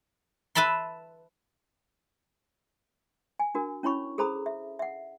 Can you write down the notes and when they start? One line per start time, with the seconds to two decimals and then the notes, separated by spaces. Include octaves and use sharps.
0.55 B4 E5 A5 B5 C6
3.40 G#5
3.55 D4 F#4 A#4
3.83 C#4 E4 C#5 B5 C#6
4.18 G#4 A4 C5 A#5 B5 D#6
4.46 E5
4.79 E5 F#5